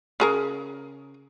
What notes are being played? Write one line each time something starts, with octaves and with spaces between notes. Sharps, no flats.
C#3 G#4 A#4